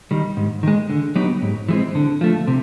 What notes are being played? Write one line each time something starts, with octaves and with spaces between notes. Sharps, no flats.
D#3 G3
G#2
D#3 G#3
D3
F#3 B3 D#4 G4
G#2
E3 G#3 C4
D3
F3 A3
C3